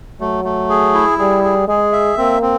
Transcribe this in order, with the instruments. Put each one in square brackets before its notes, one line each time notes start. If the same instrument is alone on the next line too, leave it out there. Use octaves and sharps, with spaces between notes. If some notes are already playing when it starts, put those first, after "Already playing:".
[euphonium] F#3 [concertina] A3
[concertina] A3
G#4
E4
[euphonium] G3 [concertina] G#4
[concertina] G#4
[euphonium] G#3 [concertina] G#4
[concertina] E5
[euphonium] A#3 [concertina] C4
[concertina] C4